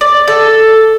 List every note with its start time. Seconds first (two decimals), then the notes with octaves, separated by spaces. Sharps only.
0.01 D5
0.28 A4